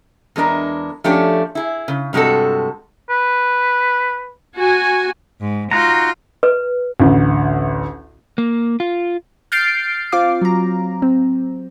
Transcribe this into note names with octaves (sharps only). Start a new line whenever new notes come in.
E2 G#3 D4 A#4
F3 A3 C#4 D4 G4 D5
E4 G#4
C#3
G2 C3 G#3 F#4 A4
B4
F#4 G#5
G#2
D#4 F4 F#4 A#5
B4
A1 D2
A#3
F4
F6 G6 A6 C7 D7
C4 F4 F5 D6
F#3 A#5
C4